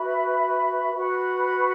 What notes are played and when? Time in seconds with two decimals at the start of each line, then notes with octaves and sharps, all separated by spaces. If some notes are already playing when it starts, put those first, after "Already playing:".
Already playing: F#4 B4 E5 B5
0.95 F#4 B4 F#5 B5